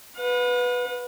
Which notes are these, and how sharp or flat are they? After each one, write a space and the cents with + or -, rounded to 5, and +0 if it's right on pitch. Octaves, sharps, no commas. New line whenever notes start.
B4 +0 F#5 -45